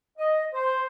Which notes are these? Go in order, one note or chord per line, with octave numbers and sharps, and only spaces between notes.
D#5
C5